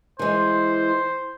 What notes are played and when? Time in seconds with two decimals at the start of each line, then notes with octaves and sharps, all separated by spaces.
0.19 E3 G#3 C5